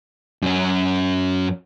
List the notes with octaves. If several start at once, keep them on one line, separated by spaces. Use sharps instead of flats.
F#2 C#4